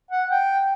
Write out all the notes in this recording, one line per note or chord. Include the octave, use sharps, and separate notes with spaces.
F#5
G5